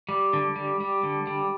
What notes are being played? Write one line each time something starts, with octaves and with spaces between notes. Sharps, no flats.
G3
D3
G3
G3
D3
G3